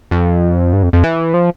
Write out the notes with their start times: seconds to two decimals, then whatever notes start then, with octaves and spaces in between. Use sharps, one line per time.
0.11 F2
0.73 G2
0.83 F2
0.93 F2
1.03 E3
1.34 F3